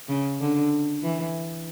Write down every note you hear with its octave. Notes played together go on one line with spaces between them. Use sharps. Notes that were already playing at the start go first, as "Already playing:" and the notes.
C#3
D3
E3